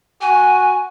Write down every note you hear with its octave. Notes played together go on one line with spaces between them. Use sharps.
F#4 G#5